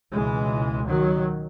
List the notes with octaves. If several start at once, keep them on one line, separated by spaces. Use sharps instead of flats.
C#2 B2 E3 G#3
D#3 F#3